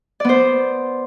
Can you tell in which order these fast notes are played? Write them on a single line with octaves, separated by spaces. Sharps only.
D5 B3 C5